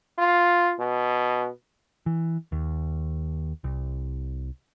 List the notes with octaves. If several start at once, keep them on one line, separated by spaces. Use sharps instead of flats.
F4
B2
E3
D#2
C2